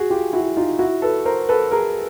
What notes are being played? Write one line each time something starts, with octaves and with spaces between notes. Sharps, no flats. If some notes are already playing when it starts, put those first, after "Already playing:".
Already playing: F#4 G#4
F4 G4
E4 F#4
D#4 F4
E4 F#4
A4 B4
A#4 C5
A4 B4
G#4 A#4